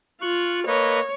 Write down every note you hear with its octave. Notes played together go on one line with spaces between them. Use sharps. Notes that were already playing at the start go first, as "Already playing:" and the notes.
F4 C#6 F#6
A#3 B4 C#5 D#5